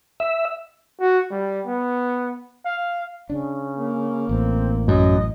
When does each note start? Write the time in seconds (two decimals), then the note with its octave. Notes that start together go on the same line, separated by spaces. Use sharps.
0.20 E5
1.00 F#4
1.31 G3
1.66 B3
2.65 F5
3.30 C#3 D4
3.77 A#3
4.29 A1 C4
4.88 F#2 D#5